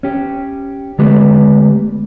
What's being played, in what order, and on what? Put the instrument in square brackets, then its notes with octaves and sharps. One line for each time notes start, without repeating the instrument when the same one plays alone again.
[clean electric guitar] C#4 G4
D3 G#3 A3 B3 G4 B4